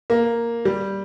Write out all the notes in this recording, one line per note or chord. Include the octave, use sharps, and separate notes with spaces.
A#3
G3